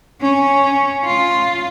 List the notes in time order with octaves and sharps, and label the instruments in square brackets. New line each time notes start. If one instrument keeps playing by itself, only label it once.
[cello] C#4
F4